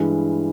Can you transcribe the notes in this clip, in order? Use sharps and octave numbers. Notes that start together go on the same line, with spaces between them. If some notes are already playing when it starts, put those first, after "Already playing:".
Already playing: G2 E3 G#3